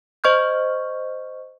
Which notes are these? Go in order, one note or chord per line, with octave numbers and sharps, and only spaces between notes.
C5 D#5 C#6 F6 G6